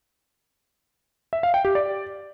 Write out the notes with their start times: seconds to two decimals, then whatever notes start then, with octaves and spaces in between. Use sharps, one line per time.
1.33 E5
1.43 F5
1.54 G5
1.65 G4
1.75 D5